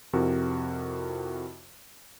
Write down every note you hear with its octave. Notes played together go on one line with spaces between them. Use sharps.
F2 C3 E4 F#4 A#4